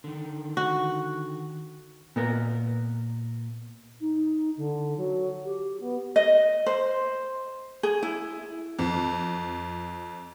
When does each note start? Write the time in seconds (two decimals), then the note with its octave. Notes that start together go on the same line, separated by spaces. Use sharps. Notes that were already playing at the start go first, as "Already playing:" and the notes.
0.04 D3 D#3
0.57 F#4
2.16 A#2 B3 A#4
4.00 D#4
4.56 D3
4.97 F#3
5.44 G4
5.79 B3
6.16 D#5
6.66 C5
7.83 G#4
8.03 E4
8.79 F2